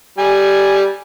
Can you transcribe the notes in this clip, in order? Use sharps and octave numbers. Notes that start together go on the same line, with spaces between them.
G3 G#5